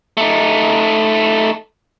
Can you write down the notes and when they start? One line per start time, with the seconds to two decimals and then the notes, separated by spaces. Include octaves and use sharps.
0.17 A3 D#4